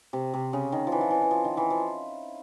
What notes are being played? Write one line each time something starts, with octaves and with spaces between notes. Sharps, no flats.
C3
C3
C#3
D#3
F3
E3
F3
E3
E3
F3
D#3
E3
F3